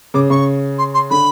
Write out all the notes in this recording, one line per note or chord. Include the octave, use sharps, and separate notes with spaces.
C#3 D6
C#3 C#6
C6
C6
D3 B5